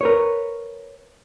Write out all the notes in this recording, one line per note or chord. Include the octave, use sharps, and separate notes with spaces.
A#4 B4 C#5